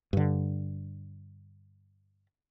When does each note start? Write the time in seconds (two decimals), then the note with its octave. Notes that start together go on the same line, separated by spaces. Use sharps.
0.13 G2 D3